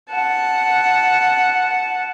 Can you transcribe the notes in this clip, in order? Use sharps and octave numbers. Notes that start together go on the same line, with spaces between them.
F#5 A5